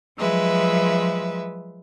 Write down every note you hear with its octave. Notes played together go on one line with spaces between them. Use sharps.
F3 F#3 G#3 B4 E5